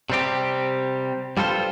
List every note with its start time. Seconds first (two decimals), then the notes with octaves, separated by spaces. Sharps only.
0.10 C3 G3 C4 G4
1.37 G2 G3 F4 A4 C5